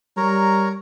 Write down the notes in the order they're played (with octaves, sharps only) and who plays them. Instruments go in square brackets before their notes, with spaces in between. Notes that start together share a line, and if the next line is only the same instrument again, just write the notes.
[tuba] G3 [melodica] A#4 C#5 A#5